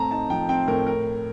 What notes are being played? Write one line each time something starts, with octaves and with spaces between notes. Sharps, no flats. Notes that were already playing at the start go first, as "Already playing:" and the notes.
Already playing: A2 C4 A5 A#5
D#4 A5
F3 G5
C4 G5
A2 A#4
A#4